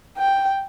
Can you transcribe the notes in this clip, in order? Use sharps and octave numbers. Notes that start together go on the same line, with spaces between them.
G5